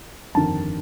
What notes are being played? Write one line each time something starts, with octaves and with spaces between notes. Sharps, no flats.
G1 F2 D#3 A5